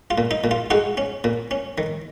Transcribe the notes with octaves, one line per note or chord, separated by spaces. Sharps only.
F4
A#2
D#4
A#2
F4
G#3 D#4 F#4
C#4
A#2
C#4
D#3